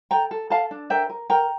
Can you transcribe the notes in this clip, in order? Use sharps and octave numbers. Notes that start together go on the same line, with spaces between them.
A4 G5 A#5
A4
A4 F5 A5
D4
A#4 E5 G5
A#4
A#4 G5 A#5